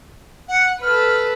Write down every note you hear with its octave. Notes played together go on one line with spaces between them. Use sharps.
F#5
A4 B4 F6